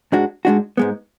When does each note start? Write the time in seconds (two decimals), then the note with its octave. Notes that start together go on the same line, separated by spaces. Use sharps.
0.12 G#2 G#3 D4 F#4
0.45 G#2 G#3 D4 F#4
0.77 G#2 G#3 B3